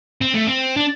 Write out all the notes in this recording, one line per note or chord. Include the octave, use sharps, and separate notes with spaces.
C4
A3
C4
D4